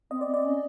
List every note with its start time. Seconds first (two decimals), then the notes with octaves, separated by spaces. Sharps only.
0.11 C4 D#5
0.21 D5
0.27 C4
0.34 D5
0.45 C#4